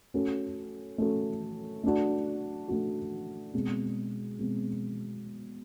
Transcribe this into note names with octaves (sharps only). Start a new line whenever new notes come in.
A3 C#4 F#4 A4
A3 C#4 F#4 A4
A3 D4 F#4
A3 D4 F#4
B2 G#3 C4
B2 G#3 C4